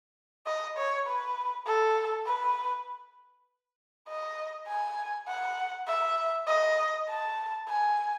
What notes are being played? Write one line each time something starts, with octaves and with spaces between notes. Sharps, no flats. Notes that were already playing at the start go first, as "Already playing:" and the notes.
D#5
C#5
B4
A4
B4
D#5
G#5
F#5
E5
D#5
A5
G#5